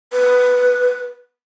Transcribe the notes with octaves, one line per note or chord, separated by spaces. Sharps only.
B4